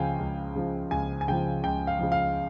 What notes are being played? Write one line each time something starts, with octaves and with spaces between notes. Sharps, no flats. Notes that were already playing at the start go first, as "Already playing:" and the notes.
Already playing: C#2 C#3 F3 F5 G5 G#5
C#2
C#3 F3
C#2 G#5
G#5
C#3 F3 G5
C#2 G5
F5
C#3 F3
F5